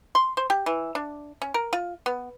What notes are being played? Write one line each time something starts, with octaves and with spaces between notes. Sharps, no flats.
C6
C5
G4
E3
D4
C#4
A#4
F4
B3